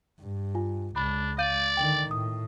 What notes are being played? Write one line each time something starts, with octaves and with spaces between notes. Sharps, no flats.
G2
F4 G#5
C#2 D4 B5
D5 F5 G6 D#7
D3 D#3 G5 F#7
A2 D#6